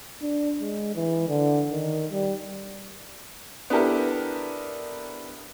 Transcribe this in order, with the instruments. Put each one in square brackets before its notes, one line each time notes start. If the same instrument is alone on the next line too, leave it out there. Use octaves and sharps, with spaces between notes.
[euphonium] D4
G#3
E3
D3
D#3
G3
[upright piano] B3 D4 E4 G4 A4 A#4